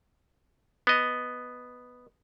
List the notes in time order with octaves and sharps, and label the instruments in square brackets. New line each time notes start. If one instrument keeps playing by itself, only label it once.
[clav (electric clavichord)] B3 D#5